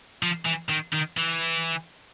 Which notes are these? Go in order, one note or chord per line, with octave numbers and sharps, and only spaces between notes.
F3
E3
D#3
D#3
E3